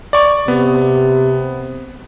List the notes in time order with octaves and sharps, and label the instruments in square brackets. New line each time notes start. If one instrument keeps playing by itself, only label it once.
[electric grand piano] D5 C#6
[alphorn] C3 [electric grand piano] B3